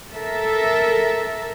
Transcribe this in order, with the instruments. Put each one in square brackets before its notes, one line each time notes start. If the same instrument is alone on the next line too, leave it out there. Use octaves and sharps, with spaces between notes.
[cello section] A4 A#4 E5